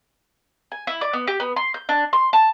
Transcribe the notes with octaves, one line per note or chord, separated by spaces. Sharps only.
G#5
E4
D5
B3
G4
B3
C6
G6
D4
C6
A5